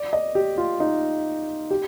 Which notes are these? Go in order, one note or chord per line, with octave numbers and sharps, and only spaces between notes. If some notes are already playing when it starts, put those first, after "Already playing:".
Already playing: D5
D#5
G4
F4
D#4
G4